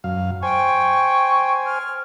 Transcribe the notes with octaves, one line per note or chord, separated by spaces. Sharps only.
F#2 F5
C5 G5 G#5 C#6
F6